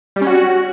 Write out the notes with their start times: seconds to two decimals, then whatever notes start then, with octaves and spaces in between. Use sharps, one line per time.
0.16 G3
0.21 C#4
0.27 F#4